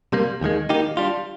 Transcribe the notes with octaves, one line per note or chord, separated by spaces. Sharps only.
C3 G3 A#3
D#2 D#3 G#3
D#3 A#3 D#4 G4
G3 D4 F4